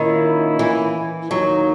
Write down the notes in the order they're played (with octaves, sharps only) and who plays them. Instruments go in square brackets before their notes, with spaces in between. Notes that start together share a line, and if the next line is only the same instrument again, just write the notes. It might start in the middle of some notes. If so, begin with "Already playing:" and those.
Already playing: [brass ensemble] A#2 A#3 C#4 E4 [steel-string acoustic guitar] D#3
[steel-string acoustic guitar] E3
[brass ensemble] D#2 D#3 A#3 D#4 [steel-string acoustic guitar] F#3